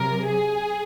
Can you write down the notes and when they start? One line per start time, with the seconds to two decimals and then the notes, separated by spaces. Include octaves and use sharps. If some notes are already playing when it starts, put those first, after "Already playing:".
Already playing: C3 F#3 A#4
0.24 G#4